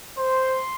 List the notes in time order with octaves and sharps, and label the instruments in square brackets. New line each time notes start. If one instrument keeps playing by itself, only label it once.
[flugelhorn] C5 [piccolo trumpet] C6